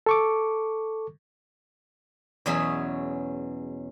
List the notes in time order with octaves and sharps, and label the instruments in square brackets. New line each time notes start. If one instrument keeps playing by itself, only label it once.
[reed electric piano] A4 C#6 D6
[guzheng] E2 B2 F#3 C#4 G#4 E5